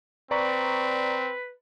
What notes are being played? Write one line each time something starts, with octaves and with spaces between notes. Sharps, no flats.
C4 B4 D5 A#5 C#6